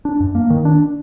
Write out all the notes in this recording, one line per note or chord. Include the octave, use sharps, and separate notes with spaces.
D4
F#2
A#3
D#3
D4